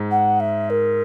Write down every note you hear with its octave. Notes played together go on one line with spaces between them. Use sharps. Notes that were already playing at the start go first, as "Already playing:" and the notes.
Already playing: G#2
F#5
E5
A#4